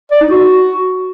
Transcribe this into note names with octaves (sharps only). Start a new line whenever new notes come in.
D5
D#4
F#4